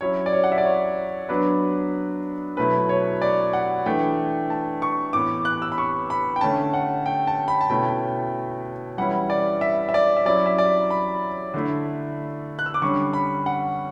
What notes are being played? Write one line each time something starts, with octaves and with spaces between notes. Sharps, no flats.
F#3 C#4 E4 C#5
D5
C#5
F#5
E5
D5
C#5
F#3 B3 D4 B4
B2 F#3 A3 E4 B4
C#5
D5
F#5
E3 A3 D4 G5
A5
C#6
A2 E3 B3 D6
F#6
E6
B5
C#6
B5
G5
D3 A3 C#4 A5
F#5
G5
A5
B5
A5
B2 A3 C#4 E4 G5
E3 G3 C#4 E4 F#5
D5
E5
E5
D5
E5
F#3 C#4 E4 D5
E5
D5
B5
D3 A3 E4
F#6
E6
D6
D3 G3 C#4 C#6
B5
F#5